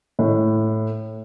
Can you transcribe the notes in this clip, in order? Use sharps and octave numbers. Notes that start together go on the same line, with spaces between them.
A2